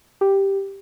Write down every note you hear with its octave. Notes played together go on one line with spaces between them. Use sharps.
G4